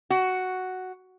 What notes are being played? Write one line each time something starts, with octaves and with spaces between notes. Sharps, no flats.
F#4